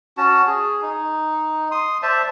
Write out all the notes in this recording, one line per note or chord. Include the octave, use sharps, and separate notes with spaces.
C#4 F#4 A5
G#4
D#4
C6 D#6
C5 D5 E5 A5